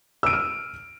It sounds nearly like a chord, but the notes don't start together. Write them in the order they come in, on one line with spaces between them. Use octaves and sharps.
E6 D7 D#7 F6